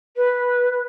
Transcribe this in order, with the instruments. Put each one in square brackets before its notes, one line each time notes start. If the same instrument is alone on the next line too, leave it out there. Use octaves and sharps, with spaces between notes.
[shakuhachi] B4